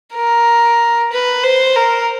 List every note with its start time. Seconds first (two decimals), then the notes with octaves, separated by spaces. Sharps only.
0.14 A#4
1.12 B4
1.43 C5
1.76 A#4